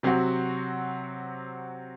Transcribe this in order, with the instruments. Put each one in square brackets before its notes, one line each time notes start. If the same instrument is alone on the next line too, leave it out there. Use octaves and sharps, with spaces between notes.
[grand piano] C3 F#3 C4 F#4